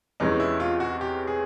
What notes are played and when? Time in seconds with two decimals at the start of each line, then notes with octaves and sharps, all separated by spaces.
0.20 E2 C3 E3 G#3 C#4 D#4
0.40 E4
0.60 F4
0.80 F#4
1.01 G4
1.27 G#4